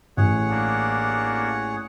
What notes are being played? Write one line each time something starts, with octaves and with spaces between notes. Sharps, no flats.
A1 G#4 C#5 F#5
A#3 D4